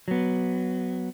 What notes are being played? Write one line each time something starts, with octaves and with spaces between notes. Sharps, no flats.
F#3 B3